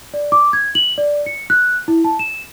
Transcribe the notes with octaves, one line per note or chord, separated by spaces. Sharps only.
D5
D6
G#6
F#7
D5
C#7
F#6
E4
A5
E7